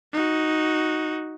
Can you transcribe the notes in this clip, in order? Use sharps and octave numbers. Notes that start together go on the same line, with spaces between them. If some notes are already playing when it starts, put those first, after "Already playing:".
D#4 F#4